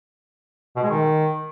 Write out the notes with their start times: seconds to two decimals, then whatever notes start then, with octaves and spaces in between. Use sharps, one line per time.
0.76 B2
0.83 G#3
0.90 D#3